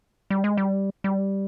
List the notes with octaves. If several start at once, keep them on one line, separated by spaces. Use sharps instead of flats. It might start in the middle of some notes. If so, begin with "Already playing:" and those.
G3
G#3
G3
G3